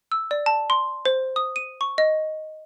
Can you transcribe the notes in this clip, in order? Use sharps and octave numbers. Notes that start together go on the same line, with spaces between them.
E6
D5
A5
C6
C5
D#6
D#7
C#6
D#5